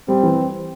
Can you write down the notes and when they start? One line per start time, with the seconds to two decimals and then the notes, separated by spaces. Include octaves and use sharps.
0.08 G3 C4
0.23 E3